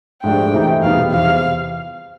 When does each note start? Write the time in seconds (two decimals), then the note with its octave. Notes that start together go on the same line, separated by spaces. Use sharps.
0.24 G#2 F3 A3 D4 G4 G5
0.54 C3 E3 A3 C4 D#4
0.83 E2 B2 G3 B3 D#4 F5
1.11 E2 C3 F3 F5